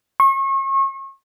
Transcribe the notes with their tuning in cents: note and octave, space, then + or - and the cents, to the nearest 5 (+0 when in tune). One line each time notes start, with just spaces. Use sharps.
C#6 -35